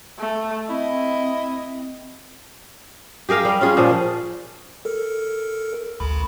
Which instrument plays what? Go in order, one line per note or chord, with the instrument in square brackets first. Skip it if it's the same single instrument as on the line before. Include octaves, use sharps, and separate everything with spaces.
[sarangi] A3
[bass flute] C4 [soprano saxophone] E4 [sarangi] D#5
[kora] G4 G#4 A#4 F5
G3
C#4 F4 G#4
A#2 F3 G#4
[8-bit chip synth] A4 A#4
A1 D2 B5